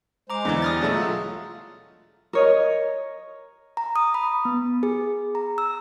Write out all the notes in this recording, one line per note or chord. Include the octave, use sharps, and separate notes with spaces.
G#3 C5 A#5 D6
E2 D3 E3
G3 D#6 F6 A6
B2 F#3 G#3 A3 A4 A#5
F4 E5
A#4 C#5 D#5
A#5
D#6
B5
B3
G#4
A#5
E6